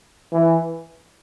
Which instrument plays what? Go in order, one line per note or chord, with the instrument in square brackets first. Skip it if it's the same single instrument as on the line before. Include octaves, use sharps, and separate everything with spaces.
[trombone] E3